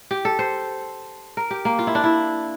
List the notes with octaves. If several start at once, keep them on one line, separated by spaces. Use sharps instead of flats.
G4
A4
C5
A#4
G4
A#3
F4
E4
D4
E4